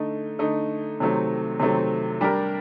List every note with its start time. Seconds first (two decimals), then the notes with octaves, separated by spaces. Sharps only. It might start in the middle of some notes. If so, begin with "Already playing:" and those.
Already playing: D3 A3 D#4
0.39 D3 A3 D#4
1.00 C3 D#3 F#3 A3 C4
1.60 C3 D#3 F#3 A3 C4
2.21 G3 D4 G4 A#4